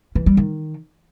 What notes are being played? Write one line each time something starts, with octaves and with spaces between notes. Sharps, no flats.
E3
G3
D#3